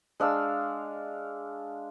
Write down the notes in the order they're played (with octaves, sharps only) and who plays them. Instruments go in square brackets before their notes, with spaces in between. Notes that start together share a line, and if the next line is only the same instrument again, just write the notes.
[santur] G#3 D4 F5 E6